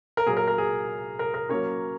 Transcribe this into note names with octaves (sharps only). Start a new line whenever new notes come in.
A#4
A#2 F#3 A#3 G#4
A#4
A#4
G#4
A#4
A#4
F#3 A#3 C#4 A#4 C#5